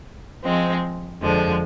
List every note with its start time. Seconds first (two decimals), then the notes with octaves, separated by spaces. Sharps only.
0.44 F3 G#3 C4
1.22 F2 D3 F3 G#3